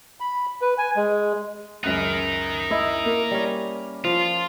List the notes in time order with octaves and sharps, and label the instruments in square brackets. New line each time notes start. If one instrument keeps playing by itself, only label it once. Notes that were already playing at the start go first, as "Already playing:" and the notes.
[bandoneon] B5
B4
G#5
G#3
[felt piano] C#2 F#2 F#6 [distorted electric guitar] D#4 A#4
[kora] E4 D#5
[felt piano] A#3
[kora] G3 C#4
[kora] F3 [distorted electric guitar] F4